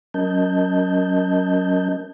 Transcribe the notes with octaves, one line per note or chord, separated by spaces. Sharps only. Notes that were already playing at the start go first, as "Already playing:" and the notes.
F#3 C#4 A#4 D#5 A5 G6